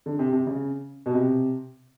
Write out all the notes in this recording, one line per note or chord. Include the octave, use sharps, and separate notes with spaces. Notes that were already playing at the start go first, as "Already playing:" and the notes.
D3
C3
C3
C#3
B2
C3